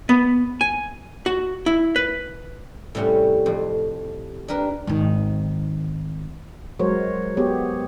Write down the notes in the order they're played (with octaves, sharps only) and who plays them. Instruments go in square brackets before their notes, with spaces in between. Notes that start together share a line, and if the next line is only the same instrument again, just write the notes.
[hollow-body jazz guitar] B3
G#5
F#4
E4
B4
[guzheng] A2 C3 G3 C#4 F#4
F2 A2 C5
D4 G4 A#4 B4
[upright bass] G#1 D#3
[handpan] F#3 G#3 F#4 A#4 C5 C#5
B3 G4 G#4 C#5